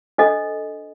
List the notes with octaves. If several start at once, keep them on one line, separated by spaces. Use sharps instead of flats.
D4 A4 C5 D#5